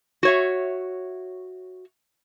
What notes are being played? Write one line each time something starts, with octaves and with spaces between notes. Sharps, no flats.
F#4 C#5 E5